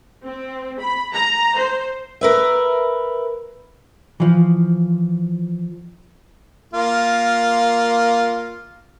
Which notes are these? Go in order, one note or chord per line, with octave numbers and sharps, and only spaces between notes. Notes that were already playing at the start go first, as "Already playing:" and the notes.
C4
B5
A#5
C5
A#4 B4 E5
E3 F3
A#3 F4